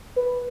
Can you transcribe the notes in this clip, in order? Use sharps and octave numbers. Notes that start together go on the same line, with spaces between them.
B4